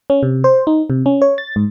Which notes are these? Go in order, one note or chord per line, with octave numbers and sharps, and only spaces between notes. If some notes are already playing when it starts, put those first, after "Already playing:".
C#4
C3
C5
D#4
C3
C#4
C#5
A6
G#2